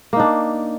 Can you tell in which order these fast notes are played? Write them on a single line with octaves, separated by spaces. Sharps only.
A#3 D#4 D4